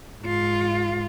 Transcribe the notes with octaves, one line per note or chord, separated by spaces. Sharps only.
G#2 F4